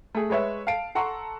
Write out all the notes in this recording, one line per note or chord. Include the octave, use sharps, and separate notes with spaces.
A3 G#4
G#3 B4 C#5 E5
F5 A5 C7 D7
A4 F#5 A#5 C6 C#6